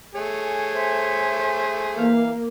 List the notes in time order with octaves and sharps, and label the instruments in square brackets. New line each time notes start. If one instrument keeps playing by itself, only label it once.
[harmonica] A3 G#4 [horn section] A4 C#5 G#5
[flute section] C5 E5
[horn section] E3 F5 [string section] A#3